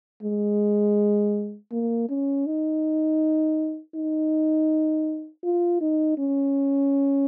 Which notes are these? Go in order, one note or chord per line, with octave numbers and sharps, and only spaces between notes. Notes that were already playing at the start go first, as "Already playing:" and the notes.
G#3
A#3
C#4
D#4
D#4
F4
D#4
C#4